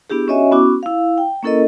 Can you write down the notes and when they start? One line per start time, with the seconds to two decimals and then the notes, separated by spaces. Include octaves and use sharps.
0.10 B3 D4 E4 G4 G#4
0.28 C#4 F#4 C#5 D#5 E5 G#5
0.51 B3 C#4 E4 F#4 D6
0.83 E4 F5
1.18 G5
1.43 A#3 C#4 E4 A4 A#4 D#5